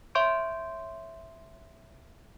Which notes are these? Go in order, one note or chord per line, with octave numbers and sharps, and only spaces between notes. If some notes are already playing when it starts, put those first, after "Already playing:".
C#5 E5 C6 C#6 G6 D7